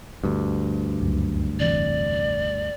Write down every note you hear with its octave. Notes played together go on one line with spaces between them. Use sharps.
D2 G2
C#2 F#2
F1 C3 E3 D5